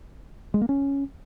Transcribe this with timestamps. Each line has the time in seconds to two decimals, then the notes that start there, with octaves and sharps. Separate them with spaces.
0.54 G#3
0.61 A#3
0.69 C#4